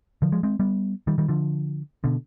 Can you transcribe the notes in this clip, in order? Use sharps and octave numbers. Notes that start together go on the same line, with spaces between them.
D3 F3
F3 G#3
G#3 C4
G3 B3
D#3 G3
D#3 G3
D3 F3
B2 D3